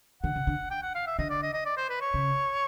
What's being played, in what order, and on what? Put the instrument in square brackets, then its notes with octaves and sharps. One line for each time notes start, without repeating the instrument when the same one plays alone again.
[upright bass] D3 [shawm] F#5
[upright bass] C#3
D3
[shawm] G5
F#5
F5
E5
[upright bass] D3 [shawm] D#5
[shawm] D5
D#5
D#5
D5
C5
B4
C#5
[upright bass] C#3